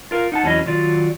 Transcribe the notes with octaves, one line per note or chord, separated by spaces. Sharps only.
F4 A#4 F5
D#4 F#5 A5
E2 F#3 C#4 E4 D#5
D#3 F#3 F4 D5